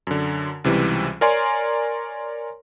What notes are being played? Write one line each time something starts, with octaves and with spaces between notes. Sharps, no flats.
F#2 D3
C#2 C3 E3 G3
A#4 C#5 D5 G#5 A#5 C6